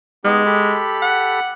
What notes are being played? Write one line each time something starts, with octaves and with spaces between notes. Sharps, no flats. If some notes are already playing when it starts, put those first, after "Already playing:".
G#3 B3 D#4 G4
G4 A4 B5
F#5